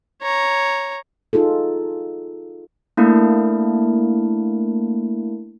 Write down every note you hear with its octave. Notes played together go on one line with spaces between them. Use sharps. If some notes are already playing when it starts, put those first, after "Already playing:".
C#5 A#5
D#4 F4 G#4 A4
A3 A#3 D4 E4 A#4